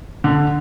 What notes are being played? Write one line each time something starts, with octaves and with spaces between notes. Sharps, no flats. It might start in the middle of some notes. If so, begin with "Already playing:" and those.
D3